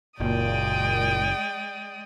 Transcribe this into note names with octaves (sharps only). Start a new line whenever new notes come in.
F#1 A#2 G#3 D5 G5 D#6